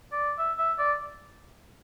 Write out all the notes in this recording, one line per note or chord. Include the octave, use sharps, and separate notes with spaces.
D5
E5
E5
D5